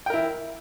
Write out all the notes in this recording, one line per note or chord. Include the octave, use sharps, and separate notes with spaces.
E4 A#4 G5